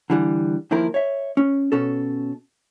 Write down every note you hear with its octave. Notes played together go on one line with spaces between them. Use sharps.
D3 E3 G3
D#2 D#3 F3 E4 A#4
C#5 E5
C#4
B2 C#4 A4